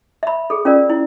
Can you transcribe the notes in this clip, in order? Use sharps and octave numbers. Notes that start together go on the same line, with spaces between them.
E5 B5
G#4 A4
C#4 F4 A#4 D5
E4